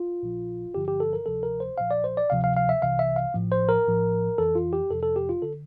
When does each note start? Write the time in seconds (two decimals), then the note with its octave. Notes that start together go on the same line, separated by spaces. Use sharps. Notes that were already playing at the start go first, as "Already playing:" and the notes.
Already playing: F4
0.23 A#1 A#2 F3
0.74 G1 G2 D3 F3 G4
0.88 G4
1.00 A4
1.13 A#4
1.26 D2 C3 F3 A4
1.43 A#4
1.60 C5
1.78 A#1 A#2 F3 F5
1.91 D5
2.04 C5
2.17 D5
2.30 D2 C3 F3 F5
2.44 F5
2.56 F5
2.69 E5
2.82 C2 C3 E3 F5
2.99 E5
3.16 F5
3.34 A1 A2 F3
3.52 C5
3.69 A#4
3.86 A#1 A2 F3
4.38 F2 E3 A4
4.55 F4
4.73 G4
4.90 F2 C3 F3 A4
5.03 A4
5.16 G4
5.29 F4
5.42 D3 A4